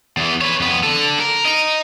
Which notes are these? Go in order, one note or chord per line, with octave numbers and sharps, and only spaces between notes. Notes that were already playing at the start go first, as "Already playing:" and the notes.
E2 E3
B4 C#5
F2 B3
D3 A4
A#4
D#5 A#5